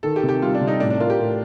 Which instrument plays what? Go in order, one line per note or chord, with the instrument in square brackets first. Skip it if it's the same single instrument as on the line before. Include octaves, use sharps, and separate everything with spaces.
[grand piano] D#3 [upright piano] A4
[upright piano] G4
[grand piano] C3
[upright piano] G4
[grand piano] G3 [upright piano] F4
[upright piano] D4
[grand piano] C3
[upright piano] D#4
[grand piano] A2 [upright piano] D4
[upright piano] D4
[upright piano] F4 [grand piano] A#4
[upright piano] G4
[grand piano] A2